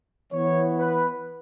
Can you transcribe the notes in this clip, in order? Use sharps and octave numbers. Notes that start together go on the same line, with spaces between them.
E3 B3 C#5
B4